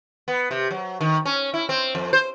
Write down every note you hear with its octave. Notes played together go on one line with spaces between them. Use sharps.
B3
C3
F#3
D#3
C#4
E4
C4
F2
C5